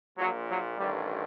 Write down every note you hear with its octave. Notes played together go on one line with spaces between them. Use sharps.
A#1 A#2 F#3
F#3
A1 G2 D#3 G3